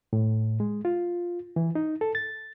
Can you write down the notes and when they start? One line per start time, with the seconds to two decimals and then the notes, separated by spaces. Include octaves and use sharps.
0.13 A2
0.60 G#3
0.85 F4
1.56 E3
1.75 D#4
2.01 A4
2.15 A6